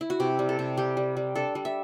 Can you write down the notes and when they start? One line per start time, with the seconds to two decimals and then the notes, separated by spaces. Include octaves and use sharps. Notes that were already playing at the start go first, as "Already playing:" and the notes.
0.01 E4
0.10 F#4
0.20 C3 G4
0.39 G3
0.49 A4
0.59 C3
0.77 G3 G4
0.97 G3
1.17 G3
1.35 D4 A4
1.55 G3
1.65 E5